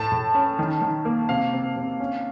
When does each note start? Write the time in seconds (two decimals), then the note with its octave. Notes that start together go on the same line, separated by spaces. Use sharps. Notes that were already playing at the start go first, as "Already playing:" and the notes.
Already playing: A2 A5
0.12 A2
0.35 C#4
0.59 D#3
0.82 D#3
1.05 A#3
1.29 C3 F5
1.53 C3
1.76 C3
2.00 C#4